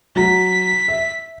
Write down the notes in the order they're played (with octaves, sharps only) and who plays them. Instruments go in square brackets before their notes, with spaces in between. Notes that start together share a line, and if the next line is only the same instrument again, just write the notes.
[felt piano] F#3 F#4 A#5 [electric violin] B6
[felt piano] E5